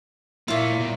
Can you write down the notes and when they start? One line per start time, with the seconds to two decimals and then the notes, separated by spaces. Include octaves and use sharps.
0.48 A#2 A#3 E4 F4 C#5 E5
0.79 B2 G3